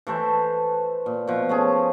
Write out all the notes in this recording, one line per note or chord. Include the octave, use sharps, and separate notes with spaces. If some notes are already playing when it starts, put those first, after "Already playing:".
E3 A3 A4 C5
A#2
B2 F3
A3 C#4 G#4